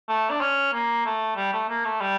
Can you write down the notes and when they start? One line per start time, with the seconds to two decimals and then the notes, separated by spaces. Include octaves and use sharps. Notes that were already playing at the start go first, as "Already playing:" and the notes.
0.09 A3
0.30 D4
0.41 C#4
0.73 A#3
1.05 A3
1.36 G3
1.53 A3
1.69 A#3
1.85 A3
2.01 G3